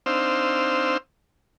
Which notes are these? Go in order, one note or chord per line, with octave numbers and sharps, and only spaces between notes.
C4 D4 D#4 C5 F5 E6